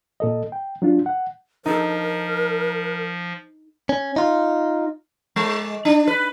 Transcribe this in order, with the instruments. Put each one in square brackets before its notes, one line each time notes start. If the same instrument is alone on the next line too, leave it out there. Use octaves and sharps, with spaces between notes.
[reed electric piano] A#2 A4 D#5
G5
F#3 D4 F4
F#5
[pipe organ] F3 [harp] D#4 A4 [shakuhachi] A#4
[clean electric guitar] C#4
D#4 F4
[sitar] G#3
D4
B4